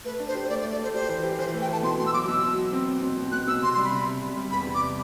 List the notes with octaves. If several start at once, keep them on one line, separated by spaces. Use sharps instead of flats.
A3 B4
D4
C5
G4
C5
A3 D5
D5
A3
D5
A3 C5
G4 C5
E3
G4
E3 C5
A3
G5
E3 A5
B2 C6
B2 C6
E6
F#3 D6
B2 E6
F#3
F#3
C4
C4
B2
B2
B2 F#6
B2 E6
C3 C6
G3 C6
B5
C3
G3
C3
G3
E2 B5
C3
D6
G3